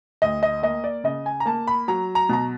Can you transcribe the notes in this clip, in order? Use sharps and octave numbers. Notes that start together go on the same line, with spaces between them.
D2 D#5
D#5
A#3 D#5
D5
C#3 D#5
G#5
A#5
A#3 A5
B5
F#3 A#5
A#5
B2 A#5